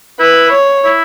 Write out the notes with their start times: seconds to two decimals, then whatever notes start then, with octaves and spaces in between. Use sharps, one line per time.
0.20 E4 B4
0.52 C#5
0.86 E4